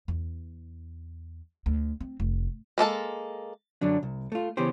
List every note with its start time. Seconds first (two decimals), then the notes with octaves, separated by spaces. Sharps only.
0.08 E2
1.66 D2
2.01 C4
2.20 F1
2.78 G#3 A#3 A4 A5
3.81 F#2 D3 F#3 D4
4.03 C2
4.32 A3 F4
4.57 C#3 E3 B3 C#4 G4 C5